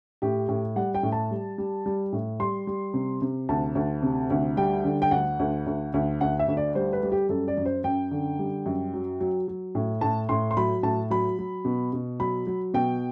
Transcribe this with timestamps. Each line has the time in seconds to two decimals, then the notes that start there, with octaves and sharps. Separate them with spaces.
0.22 A2 G4
0.49 A2
0.76 G3 F#5
0.95 G5
1.03 A2
1.12 A5
1.31 G3
1.58 G3
1.86 G3
2.13 A2
2.40 G3 C6
2.67 G3
2.94 C3
3.22 C3
3.49 D2 A5
3.75 D2
4.03 C3
4.30 D2
4.57 G3 G5
4.84 D3
5.02 G5
5.11 D2 F#5
5.40 D2
5.66 D2
5.94 D2
6.21 D2 F#5
6.39 E5
6.48 D2
6.57 D5
6.75 G3 C5
6.93 B4
7.03 G3
7.12 G4
7.29 F#2 A4
7.48 D5
7.57 F#2
7.66 C5
7.84 F#2 G5
8.11 D3
8.39 G3
8.66 F#2
8.93 F#3
9.20 F#3
9.48 F#3
9.75 A2
10.01 A2 A5
10.29 A2 C6
10.51 C6
10.57 F#3 B5
10.83 A2 A5
11.10 F#3 B5
11.39 F#3
11.65 B2
11.93 B2
12.20 F#3 B5
12.47 F#3
12.74 B2 G5